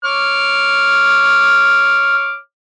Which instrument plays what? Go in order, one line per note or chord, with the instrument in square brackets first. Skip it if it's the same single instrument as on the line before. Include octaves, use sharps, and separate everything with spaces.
[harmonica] C#5 D6 F6